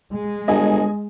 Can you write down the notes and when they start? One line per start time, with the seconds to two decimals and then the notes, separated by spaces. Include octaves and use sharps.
0.13 G#3
0.48 G1 D#5 G#5